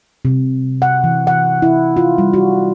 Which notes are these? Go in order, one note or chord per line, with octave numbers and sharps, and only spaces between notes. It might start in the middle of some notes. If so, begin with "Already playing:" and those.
C3
F#5
E3
F#5
E4
F4
G3
F#4